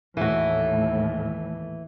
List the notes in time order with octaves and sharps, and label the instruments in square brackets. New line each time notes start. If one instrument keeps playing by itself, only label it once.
[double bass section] D#2 A2 [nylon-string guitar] E3 F#4